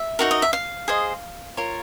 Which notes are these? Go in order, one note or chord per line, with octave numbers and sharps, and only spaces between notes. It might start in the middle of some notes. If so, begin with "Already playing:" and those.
Already playing: E5
D#4 F#4 A#4
D#5
E5
F5
G#4 C5 D#5
F4 A#4 C#5